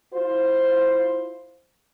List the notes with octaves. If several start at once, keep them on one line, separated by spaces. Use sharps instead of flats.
E4 F4 C5